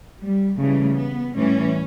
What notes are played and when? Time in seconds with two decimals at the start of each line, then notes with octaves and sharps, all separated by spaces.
0.21 G3
0.58 C#3 E3 G3 A3
0.96 B3
1.35 A2 E3 G3 C#4